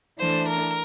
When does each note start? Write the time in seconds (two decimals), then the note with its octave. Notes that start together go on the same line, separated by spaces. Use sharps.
0.19 E3 A3 D4 C5
0.48 A#4